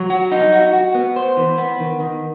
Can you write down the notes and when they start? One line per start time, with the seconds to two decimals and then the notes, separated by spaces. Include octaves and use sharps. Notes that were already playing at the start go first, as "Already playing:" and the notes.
Already playing: F#3
0.10 F#4
0.32 D#4
0.53 F#4
0.73 F#4
0.95 B3
1.16 C5
1.37 E3
1.58 B3
1.80 D#3
2.00 D#3